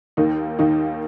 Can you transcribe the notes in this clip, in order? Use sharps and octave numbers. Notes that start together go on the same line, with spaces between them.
D#2 D#3 A#3 D#4
D#2 D#3 A#3 D#4